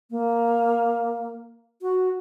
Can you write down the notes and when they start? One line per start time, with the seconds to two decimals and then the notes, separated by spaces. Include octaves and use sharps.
0.11 A#3
1.82 F#4